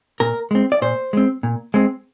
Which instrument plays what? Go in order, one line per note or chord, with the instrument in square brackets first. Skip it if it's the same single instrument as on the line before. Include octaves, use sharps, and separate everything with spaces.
[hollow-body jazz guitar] A#2 A#4
G#3 C4
D5
A#2 C5
G#3 C4
A#2
G#3 C4